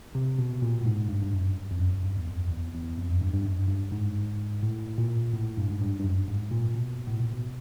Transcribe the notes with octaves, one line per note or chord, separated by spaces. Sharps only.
C3
B2
A#2
A2
G#2
G2
G2
F#2
F2
F#2
G2
E2
F2
E2
E2
F2
F#2
G2
G2
F#2
G2
G#2
A2
A#2
A2
G2
G#2
G2
G2
F#2
G#2
A#2
B2
A2
A#2
B2